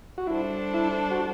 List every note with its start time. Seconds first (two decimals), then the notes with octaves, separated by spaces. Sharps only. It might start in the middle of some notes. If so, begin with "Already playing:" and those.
0.18 F#4
0.27 G3 D4 E4 A4 C5
0.74 E4
1.11 F#4